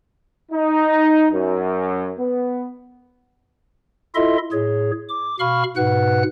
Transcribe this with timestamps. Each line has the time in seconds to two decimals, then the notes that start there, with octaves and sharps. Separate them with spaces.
0.52 D#4
1.33 F#2
2.19 B3
4.15 E4 F4 A4 D#5 E5 C6
4.52 A2 G#4 C#5
5.09 D6
5.40 B2 F5 B5 C#6 F6
5.76 G#2 B2 B4 F#5 F#6